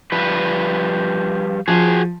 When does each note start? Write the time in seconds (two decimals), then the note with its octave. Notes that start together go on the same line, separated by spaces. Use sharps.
0.12 F3 G3 B4
1.68 F3 F#4 G#4